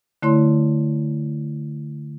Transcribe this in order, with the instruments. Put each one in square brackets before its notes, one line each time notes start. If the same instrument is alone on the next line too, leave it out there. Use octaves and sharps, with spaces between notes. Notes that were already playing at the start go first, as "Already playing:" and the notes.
[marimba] D3 A3 E4 C#5 C6